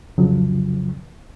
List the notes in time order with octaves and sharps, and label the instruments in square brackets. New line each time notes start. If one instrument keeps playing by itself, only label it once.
[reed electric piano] C2 F2 C#3 F3 F#3